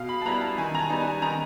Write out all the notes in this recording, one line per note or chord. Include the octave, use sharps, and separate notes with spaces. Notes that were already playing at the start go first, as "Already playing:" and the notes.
Already playing: B2 F5
B5
A5
G3 B3 E4 A#5
A5
D#3 G#5
A#5
A5
G3 B3 D#4
G#5
D#3 A#5